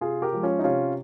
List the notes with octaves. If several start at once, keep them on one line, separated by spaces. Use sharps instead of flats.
C3 F4 G#4
G4 A#4
F3 G#3
C#4 F4
D#4
C3 C#4 F4